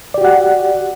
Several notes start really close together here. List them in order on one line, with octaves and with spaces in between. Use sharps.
D5 G4 F#4 F#5